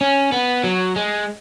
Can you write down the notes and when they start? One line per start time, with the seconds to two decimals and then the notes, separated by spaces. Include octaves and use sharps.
0.01 C#4
0.32 B3
0.64 F#3
0.96 G#3